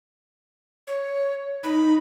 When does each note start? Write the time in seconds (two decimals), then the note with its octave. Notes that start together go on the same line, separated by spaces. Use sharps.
0.87 C#5
1.63 D#4 B5